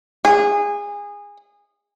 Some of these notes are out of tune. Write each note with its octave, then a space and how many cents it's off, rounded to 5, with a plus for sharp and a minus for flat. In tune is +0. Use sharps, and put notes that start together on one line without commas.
G#4 -20